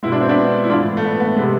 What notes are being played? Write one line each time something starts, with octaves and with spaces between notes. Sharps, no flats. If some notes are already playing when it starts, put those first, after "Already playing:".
B2 G#3 E4
D4
C4
B3 D4
E4
A2 E3 G#3 D4 F4
A3
B3
B3
C3 G#3 B3